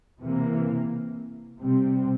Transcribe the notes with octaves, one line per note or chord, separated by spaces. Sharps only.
C3 E3 A#3
C3 G3 C4